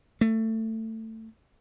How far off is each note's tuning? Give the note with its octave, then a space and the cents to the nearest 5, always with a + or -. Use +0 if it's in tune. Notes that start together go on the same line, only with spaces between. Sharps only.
A3 +20